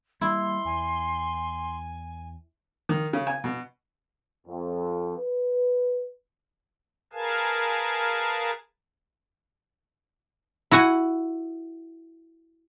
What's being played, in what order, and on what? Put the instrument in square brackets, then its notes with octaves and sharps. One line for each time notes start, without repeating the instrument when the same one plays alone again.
[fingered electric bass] G3 A#3 [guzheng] E4 [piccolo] C6
[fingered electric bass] E2 [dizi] G#5
[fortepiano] D#3
C#3
G#5
B2
[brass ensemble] F2
B4
[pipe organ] G#4 A#4 B4 F5 G#5 A5
[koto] E4 F#4 F#5 G#5